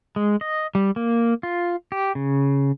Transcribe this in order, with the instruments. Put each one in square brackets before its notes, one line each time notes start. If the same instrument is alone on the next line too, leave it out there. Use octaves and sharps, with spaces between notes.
[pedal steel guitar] G#3
D#5
G3
A#3
F4
G4
C#3